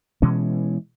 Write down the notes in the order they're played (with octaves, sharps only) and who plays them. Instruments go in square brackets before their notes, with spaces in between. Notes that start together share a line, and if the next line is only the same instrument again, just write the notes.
[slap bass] B2 E3 G#3 C#4